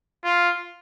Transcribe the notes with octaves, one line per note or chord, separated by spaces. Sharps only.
F4